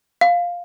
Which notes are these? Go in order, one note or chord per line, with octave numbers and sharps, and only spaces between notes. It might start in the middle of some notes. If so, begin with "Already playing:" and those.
F5